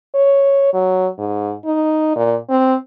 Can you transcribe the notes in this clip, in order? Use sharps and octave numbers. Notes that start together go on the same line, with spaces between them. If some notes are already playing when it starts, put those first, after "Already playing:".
C#5
F#3
G#2
D#4
A#2
C4